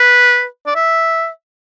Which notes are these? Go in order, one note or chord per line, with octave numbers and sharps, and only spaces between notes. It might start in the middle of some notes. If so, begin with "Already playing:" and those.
Already playing: B4
D5
E5